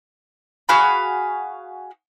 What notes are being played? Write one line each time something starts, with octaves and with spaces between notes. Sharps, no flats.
F#4 G#4 F5 B5